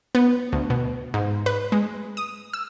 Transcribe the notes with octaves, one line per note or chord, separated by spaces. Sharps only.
B3
D2
B2
G#2
B4
G#3
D#6
E6